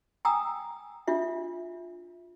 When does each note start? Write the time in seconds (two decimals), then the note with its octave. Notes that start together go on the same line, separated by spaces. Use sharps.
0.25 G5 G#5 A#5 D#6 E6
1.08 D4 F4 E5